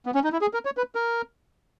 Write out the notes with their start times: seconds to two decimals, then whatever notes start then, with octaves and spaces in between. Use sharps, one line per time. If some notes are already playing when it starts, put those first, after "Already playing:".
0.06 B3
0.15 C#4
0.24 D#4
0.33 E4
0.41 G#4
0.54 A#4
0.65 C#5
0.77 B4
0.95 A#4